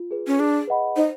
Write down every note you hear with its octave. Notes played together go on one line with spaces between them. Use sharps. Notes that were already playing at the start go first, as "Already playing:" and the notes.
Already playing: F4
G#4 B4
C#4
D4 G#4
B4 D#5 F#5 B5
D#4 C5